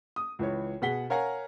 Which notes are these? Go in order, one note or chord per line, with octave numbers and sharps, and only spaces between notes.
D#6
C#2 E3 C#5
B2 G#4 F#5 B6 G7
A#4 C#5 F5 F#5 G#5 A#5